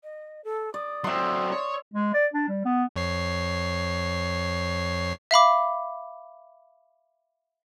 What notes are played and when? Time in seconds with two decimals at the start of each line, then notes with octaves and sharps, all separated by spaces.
0.04 D#5
0.44 A4
0.74 D5 D#6
1.04 F#3 C4 E5 C6
1.52 C#5
1.94 G#3
2.14 D5
2.34 D4
2.48 G3
2.65 B3
2.96 F2 C#5 C7
5.31 E5 F5 B5 D6